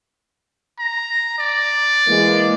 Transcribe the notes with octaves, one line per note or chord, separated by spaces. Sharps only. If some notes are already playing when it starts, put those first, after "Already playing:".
A#5
D5
E3 G#3 A#3